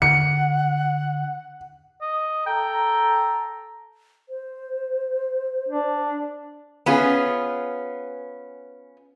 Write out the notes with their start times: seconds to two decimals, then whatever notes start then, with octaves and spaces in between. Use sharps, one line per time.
0.02 D3 F#5 C#7
2.02 D#5
2.46 A4 G5 A#5
4.29 C5
5.69 D4
6.86 B3 C#4 F4 G#4